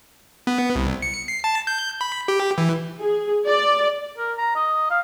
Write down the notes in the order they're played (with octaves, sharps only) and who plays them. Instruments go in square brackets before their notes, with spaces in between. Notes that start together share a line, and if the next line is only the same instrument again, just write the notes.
[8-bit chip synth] B3
C2
C#7
C7
A5
G6
B5
G4
E3
[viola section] G#4
D5
[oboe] A#4
A#5
D#5
F5